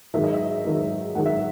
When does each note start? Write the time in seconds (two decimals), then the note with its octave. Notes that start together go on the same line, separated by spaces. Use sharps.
0.14 G#2 D#3 F#3 E5
0.24 D#5
0.34 E5
0.65 G#2 D#3 F#3
1.15 G#2 D#3 F#3 F#5
1.26 E5